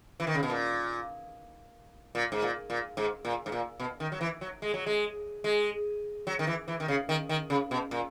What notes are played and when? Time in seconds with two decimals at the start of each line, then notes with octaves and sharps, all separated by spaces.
0.20 E3
0.27 D#3
0.34 C#3
0.43 B2
0.50 A#2
2.15 A#2
2.32 G#2
2.42 A#2
2.70 A#2
2.97 G#2
3.25 A#2
3.46 G#2
3.52 A#2
3.80 B2
4.00 D#3
4.12 F#3
4.21 E3
4.41 F#3
4.62 G#3
4.74 F#3
4.86 G#3
5.44 G#3
6.27 F#3
6.39 D#3
6.47 E3
6.68 E3
6.80 D#3
6.88 C#3
7.09 D#3
7.29 D#3
7.50 C#3
7.71 B2
7.91 A#2